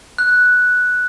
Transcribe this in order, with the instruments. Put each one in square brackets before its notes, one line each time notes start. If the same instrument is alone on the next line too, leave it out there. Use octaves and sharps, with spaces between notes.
[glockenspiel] F#6